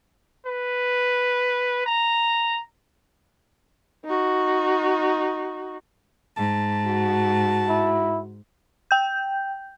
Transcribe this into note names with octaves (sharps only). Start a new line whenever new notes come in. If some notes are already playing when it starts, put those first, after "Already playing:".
B4
A#5
D#4 F#4
G#2 A5
F#4
E4
G5 G6